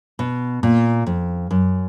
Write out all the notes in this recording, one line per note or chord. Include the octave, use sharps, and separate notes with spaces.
B2
A#2
F2
F#2